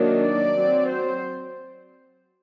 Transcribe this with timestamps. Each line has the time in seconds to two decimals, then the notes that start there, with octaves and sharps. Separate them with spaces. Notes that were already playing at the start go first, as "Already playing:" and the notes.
Already playing: D#3 F#3 A#3 D4
0.21 D5
0.55 F#3 C4
0.89 C5